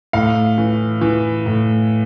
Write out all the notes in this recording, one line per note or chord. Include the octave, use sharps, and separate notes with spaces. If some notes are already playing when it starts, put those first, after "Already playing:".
A2 F5
E3
E3
A2